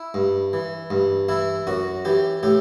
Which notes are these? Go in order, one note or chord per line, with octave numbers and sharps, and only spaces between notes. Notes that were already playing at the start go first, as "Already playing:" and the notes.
Already playing: E4
G2
E3
G2
E3 E4
F#2 F#4
E3 G4
A2 G4